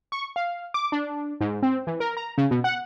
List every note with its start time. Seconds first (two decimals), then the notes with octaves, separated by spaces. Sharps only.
0.12 C#6
0.36 F5
0.74 D6
0.92 D4
1.41 G#2
1.63 C4
1.87 E3
2.00 A#4
2.17 A#5
2.38 C#3
2.51 B2
2.64 F#5